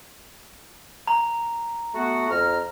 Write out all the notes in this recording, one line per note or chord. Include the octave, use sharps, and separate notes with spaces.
A#5
A3 B3 F#4
F2 A#5 F6